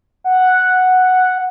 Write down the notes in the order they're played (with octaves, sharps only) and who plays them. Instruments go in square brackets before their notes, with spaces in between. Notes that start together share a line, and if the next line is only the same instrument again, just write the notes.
[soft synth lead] F#5